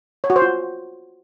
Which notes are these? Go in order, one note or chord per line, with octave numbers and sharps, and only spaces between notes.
C#5
F#4
C5
F4